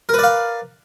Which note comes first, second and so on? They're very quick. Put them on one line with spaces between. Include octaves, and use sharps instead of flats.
A#4 B4 D5 F5